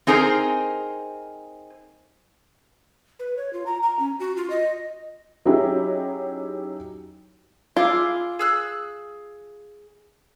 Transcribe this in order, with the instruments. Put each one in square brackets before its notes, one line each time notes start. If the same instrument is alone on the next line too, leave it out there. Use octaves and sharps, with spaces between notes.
[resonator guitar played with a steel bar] C4 D#4 G#4 A#4 C5
[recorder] B4
C#5
F4
A#5
A#5
C#4
F#4
F4
D#5
[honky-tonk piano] F#3 C#4 D#4 E4 G4 G#4
[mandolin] E4 G#4 D6 [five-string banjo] F4
[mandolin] G#4 E6 F#6